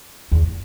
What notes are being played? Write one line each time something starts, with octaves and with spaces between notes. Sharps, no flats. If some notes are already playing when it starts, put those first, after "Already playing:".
E2